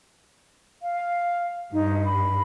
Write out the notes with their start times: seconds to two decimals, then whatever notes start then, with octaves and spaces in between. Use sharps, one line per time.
0.82 F5
1.73 G2 D#4
2.05 B5